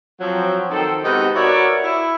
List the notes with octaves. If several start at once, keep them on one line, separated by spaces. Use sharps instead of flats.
F3 F#3 C4
D#3 C4 A4
C3 G#3 B3 D#4 F#4 A#4
F#4 A#4 B4 C#5 D5 E5
E4